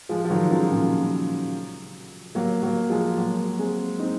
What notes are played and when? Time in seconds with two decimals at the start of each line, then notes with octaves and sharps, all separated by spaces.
0.09 F3 G#3
0.25 F3
0.30 D#3 F#3
0.51 C#3 F3
0.71 A#2 C#3
2.35 F#3 A#3
2.63 F#3 A#3
2.90 F3 G#3
3.17 F#3 A#3
3.58 G#3 C4
3.99 C4 D#4